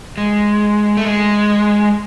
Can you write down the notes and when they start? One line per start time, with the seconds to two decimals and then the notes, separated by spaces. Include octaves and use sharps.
0.18 G#3
0.97 A3
1.05 G#3